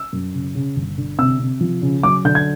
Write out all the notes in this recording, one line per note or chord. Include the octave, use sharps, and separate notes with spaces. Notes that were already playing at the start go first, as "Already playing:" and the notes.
Already playing: E6
F#2
C#3
C#3
G1
D3
C3 E6
C3
F3
C#3
F#3 D6
D3 G6
G#6